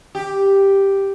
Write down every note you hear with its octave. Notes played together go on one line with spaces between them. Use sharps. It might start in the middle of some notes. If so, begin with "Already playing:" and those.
G4